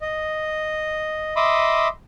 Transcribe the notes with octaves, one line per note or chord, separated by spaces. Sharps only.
D#5
D#5 E5 B5 C6 D6 D#6